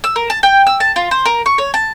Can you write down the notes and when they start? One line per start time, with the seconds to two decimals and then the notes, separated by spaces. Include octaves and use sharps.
0.04 E6
0.16 A#4
0.30 A5
0.43 G5
0.67 E6
0.80 A5
0.96 F4
1.11 C5
1.25 A#4
1.46 C#6
1.58 C#5
1.74 A5